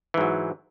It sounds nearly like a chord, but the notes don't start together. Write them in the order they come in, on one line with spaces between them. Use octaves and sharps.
E3 G#2 F#3